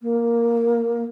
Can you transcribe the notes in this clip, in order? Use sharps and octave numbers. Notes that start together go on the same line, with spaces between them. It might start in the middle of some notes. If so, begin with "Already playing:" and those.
A#3